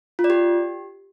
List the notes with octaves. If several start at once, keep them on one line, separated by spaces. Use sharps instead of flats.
F4
D5
G4